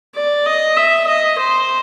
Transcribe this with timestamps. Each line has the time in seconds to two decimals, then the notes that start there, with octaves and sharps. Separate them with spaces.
0.15 D5
0.46 D#5
0.77 E5
1.07 D#5
1.38 C5